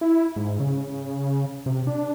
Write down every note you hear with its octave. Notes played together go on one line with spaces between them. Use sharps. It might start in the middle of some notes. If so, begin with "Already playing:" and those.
E4
G#2
C#3
C3
D4